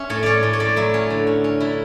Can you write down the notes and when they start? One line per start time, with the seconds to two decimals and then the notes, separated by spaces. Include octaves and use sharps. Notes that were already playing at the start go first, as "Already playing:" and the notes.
Already playing: C#4 E5
0.10 A2 C#5
0.23 C#4 C#5 D5
0.43 A2
0.53 C#5
0.60 A2 D5
0.76 F#3 E4
0.94 C#4
1.10 D3
1.27 C#4
1.44 C#4
1.60 D3 E4